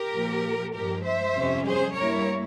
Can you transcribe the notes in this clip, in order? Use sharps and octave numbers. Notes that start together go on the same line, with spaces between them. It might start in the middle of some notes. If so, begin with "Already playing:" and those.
Already playing: G4 A#4
A#2 F3 A#3
G2 F3 G#3 G4 A#4
C5 E5
F2 C3 G3 C#4
G#4 C5
G2 G3 A#3 E4 A#4 C#5